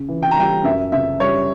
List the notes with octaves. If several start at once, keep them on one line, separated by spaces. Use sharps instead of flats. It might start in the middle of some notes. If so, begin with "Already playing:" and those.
Already playing: C#3
E3
G5
A#5
G3 G5
F#2 E5
C#3 E5
G3 C#5